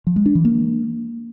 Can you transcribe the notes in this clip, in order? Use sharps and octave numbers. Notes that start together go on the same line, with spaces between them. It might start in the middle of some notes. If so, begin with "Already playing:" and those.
F3
G#3
D4
E3
A#3